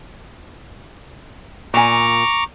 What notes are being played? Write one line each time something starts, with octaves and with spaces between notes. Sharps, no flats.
A#2 G#5 A#5 C#6 D6